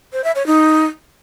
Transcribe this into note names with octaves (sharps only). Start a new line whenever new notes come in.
C5
E5
C#5
D#4